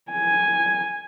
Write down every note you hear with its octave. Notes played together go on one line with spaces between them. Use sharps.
G#5